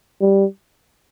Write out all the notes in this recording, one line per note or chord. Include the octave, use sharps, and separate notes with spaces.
G3